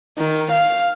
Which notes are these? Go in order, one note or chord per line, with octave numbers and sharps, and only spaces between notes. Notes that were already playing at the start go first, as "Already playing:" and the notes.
D#3
F5